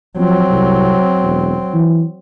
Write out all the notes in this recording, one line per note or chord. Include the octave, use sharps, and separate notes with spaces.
F3 F#3 C4
C2
E1
E3